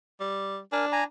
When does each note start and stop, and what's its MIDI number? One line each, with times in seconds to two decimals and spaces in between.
0.20 0.59 55
0.72 1.03 62
0.72 0.85 70
0.72 0.85 80
0.92 1.04 80
0.92 1.04 82